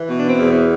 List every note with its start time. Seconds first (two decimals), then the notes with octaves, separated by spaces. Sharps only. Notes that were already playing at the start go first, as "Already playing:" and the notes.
Already playing: E3
0.09 B2
0.17 D4
0.27 C4
0.38 E2
0.48 B3